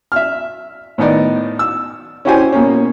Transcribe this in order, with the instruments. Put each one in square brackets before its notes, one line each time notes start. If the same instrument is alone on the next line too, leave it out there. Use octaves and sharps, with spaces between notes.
[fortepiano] E5 F6
A2 D#3 B3 D#4 D5
E6
C#4 E4 F#4 G4 C5 G#5
B2 A#3 C#4